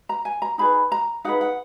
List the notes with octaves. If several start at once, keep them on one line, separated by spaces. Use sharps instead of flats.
A#5
G#5
A#5
D#4 G#4 B4 B5
A#5
D#4 G#4 B4 F#5
F#5